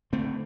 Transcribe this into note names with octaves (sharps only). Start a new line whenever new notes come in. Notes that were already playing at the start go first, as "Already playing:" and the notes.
D3 A3 C4